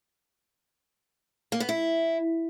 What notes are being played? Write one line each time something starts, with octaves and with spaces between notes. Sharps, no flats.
A#3
B3
E4